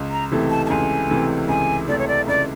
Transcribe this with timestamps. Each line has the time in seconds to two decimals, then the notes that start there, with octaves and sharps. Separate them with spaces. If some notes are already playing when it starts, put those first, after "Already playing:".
Already playing: C#2
0.11 A#5
0.31 C3 E3 A3
0.50 A5
0.66 A5
0.70 C#2 G#5
1.10 C3 E3 A3
1.48 C#2 G#5
1.88 C3 E3 A3 D5
1.99 C#5
2.08 D5
2.27 C#2 D5